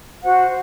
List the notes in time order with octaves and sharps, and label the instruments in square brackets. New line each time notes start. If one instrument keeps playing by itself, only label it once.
[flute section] F#4 C5 F#5